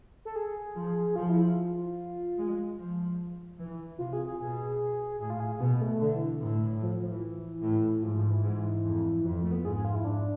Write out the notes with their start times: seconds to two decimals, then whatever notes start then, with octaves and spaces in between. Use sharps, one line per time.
0.25 A4
0.36 G#4
0.76 F3
1.16 F3 F4
1.29 E4
1.43 F4
2.38 G#3
2.78 F3
3.59 E3
3.98 C3 F4
4.13 G#4
4.26 G#4
4.39 B2 G#4
5.20 A2 G#4
5.30 F4
5.40 G#4
5.60 B2 B3
5.71 B3
5.81 A3
6.00 D3
6.14 E3
6.42 A2
6.82 F3
7.02 F3
7.12 E3
7.63 A2
8.03 G#2 F3
8.16 F3
8.30 E3
8.43 G#2
8.84 F2
9.25 F2 F3
9.43 A3
9.51 B3
9.65 G#2 G#4
9.75 G#4
9.85 F4
9.95 E4
10.04 G#2 D4